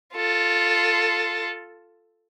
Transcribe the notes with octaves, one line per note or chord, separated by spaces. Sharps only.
F4 A4